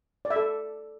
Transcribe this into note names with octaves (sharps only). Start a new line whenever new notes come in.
D5
E5
A4